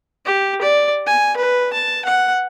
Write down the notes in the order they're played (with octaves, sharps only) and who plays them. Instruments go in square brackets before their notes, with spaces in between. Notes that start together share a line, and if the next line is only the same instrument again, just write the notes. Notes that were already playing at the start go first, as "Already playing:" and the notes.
[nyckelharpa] G4
D5
G#5
B4
A5
F#5